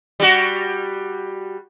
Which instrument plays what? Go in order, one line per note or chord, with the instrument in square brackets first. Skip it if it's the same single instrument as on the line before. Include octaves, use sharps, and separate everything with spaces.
[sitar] G3 F#4